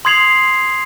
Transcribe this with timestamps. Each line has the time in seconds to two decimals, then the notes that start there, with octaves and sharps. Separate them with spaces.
0.05 C6 D#6 G#6 C7 F7 F#7